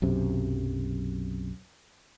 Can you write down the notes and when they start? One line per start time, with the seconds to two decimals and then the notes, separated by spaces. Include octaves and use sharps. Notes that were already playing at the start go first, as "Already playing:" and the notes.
0.02 B1 F#2 C3